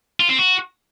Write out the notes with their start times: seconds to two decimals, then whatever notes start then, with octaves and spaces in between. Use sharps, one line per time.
0.20 F4
0.29 C4
0.38 F#4